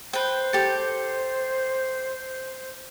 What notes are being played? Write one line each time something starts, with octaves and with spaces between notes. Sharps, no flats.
B4 C5 G5
G4 A4